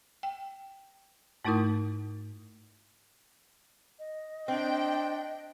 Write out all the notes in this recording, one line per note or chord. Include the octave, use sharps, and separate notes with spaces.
G5
G#2 A3 D#4 E4 A#4 D#6
D#5
C4 D4 G5